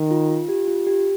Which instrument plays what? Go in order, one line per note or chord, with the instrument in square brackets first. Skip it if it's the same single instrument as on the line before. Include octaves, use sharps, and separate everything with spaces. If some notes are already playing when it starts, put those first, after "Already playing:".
Already playing: [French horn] D#3
[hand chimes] F4
F4
G4
F4
G4